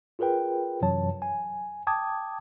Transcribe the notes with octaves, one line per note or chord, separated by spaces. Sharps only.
F4 G#4 A#4 B4 G5
F#2 C3 E3 F#3 C#5 A5
G#5
G5 A5 D6 D#6 G#6